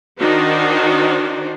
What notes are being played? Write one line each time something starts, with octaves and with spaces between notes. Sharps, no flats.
D#3 D4 D#4 F#4 C5 D5